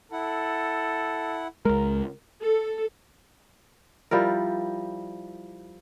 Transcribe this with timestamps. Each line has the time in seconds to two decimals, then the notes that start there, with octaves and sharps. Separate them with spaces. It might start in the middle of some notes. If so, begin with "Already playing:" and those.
0.12 E4 A4 F#5
1.65 C#2 G#3 A#4
2.42 A4
4.11 F3 G3 E4 A#4